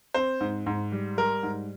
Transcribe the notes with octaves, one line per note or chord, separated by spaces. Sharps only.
C4 C5
G#2
G#2
G3
G3 A#4
G#2